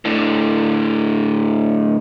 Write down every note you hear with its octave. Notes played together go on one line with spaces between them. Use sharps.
A2 D3